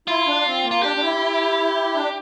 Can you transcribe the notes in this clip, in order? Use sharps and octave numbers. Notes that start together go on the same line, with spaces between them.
E4 F4
D4
C4
A#3
F4
D4 G4
D4
E4
D4